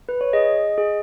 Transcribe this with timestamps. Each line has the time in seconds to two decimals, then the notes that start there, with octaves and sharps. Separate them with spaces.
0.09 B4
0.21 C#5
0.33 G#4 D#5
0.78 G#4